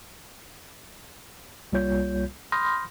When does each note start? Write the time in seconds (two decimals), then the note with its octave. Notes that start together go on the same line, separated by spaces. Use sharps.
1.72 C2 G3 A#3 F4 C#5 G6
2.52 B5 C6 D#6 F6 G6 A#6